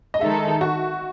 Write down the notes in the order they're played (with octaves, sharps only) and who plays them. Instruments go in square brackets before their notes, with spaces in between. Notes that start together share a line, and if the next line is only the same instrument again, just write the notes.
[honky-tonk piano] D#5
[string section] D#3 G#3 D#4 A4 [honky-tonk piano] E5
[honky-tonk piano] F#4